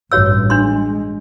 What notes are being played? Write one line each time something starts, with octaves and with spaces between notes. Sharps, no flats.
A1 G2 F#4 C#5 E6
G#3 D4 C6